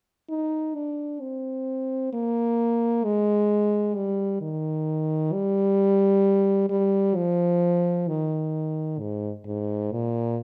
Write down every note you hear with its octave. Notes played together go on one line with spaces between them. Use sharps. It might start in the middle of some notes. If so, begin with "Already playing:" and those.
D#4
D4
C4
A#3
G#3
G3
D#3
G3
G3
F3
D#3
G#2
G#2
A#2